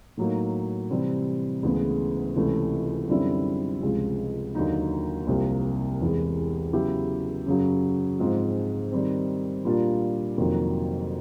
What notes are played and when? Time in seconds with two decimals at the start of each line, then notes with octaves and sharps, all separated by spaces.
0.17 A2 F#3 A#3 D#4
0.90 C3 E3 G3 C4
1.63 D2 C#3 E3 G#3 B3
2.36 C#2 C3 E3 A3 C#4
3.09 F#2 D3 G3 C4 E4
3.82 C#2 C3 F3 G#3
4.55 D#2 D3 F#3 A#3 D#4
5.27 C2 C3 F3 A#3
6.00 E2 C3 E3 G#3
6.73 C#3 F#3 B3 E4 G4
7.46 F#2 C#3 F#3
8.19 G#2 F3 G#3 C4 F4
8.92 D#3 G3 C4
9.65 A#2 G3 A#3 D4 F4
10.38 F2 C3 D#3 F#3 A#3